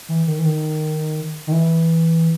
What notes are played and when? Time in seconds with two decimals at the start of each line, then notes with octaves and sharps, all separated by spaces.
0.09 E3
0.27 D#3
0.39 E3
0.45 D#3
1.47 D#3
1.52 E3